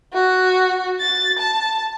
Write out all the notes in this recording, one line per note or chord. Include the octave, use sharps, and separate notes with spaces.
F#4
A6
A5